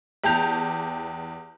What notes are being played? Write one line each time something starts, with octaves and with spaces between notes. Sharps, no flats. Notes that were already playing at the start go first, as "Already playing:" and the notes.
E2 G4 A5 G6 F7